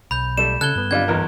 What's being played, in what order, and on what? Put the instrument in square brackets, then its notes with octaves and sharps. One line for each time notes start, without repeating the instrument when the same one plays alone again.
[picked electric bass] B1 [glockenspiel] B5 G6
[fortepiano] G3 A3 [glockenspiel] E7
[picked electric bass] C#3 [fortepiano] A4 [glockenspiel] F#6 G#6 G7
[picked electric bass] G2 B3
[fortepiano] D3 G3 F4 [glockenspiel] G#6
[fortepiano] B1 E2 A#4